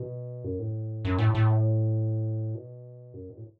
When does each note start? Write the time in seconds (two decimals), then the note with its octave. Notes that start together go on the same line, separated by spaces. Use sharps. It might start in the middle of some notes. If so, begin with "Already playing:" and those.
Already playing: B2
0.44 F#2
0.59 A2
1.05 F#2
1.19 A2
1.35 A2
2.55 B2
3.14 F#2
3.30 B2
3.37 A2